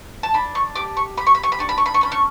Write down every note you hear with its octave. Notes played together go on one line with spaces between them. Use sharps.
A5
D4 B5
C#6
G4 D6
C#6
G4 B5
C#6
B5
C#6
B5
D4 C#6
B5
C#6
B5
C#6
C#4 B5
C#6